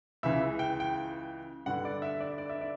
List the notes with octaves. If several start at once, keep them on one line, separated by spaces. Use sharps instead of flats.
C#2 C#3 E3 E5
G5
G5
G2 D3 F#5
D5
E5
D5
D5
E5
D5